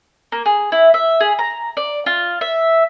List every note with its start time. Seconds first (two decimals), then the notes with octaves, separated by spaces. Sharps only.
0.32 A#3
0.46 G#4
0.72 E4
0.94 E5
1.20 G#4
1.39 A#5
1.77 D5
2.06 F4
2.41 E5